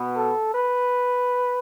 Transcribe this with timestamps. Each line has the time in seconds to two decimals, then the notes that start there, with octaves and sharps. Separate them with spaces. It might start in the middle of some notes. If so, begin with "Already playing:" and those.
Already playing: B2 B3
0.17 A4
0.55 B4